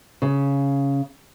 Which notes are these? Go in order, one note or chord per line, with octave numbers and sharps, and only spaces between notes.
C#3